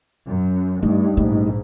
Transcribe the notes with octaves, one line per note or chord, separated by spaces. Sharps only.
F#2
G2 G3 A3 D#4
A#1 G#2 A3 C#4